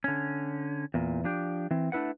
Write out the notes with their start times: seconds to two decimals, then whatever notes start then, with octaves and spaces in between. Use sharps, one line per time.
0.04 D3 C#4
0.94 E2 A#2
1.24 F3 D4 G4
1.71 E3 C4
1.92 A3 D4 E4 B4 F#5